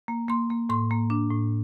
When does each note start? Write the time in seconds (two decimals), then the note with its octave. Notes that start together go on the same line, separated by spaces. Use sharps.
0.08 A#3
0.29 A#3 C6
0.50 A#3
0.69 A2 C6
0.91 A#3
1.10 D4
1.31 A2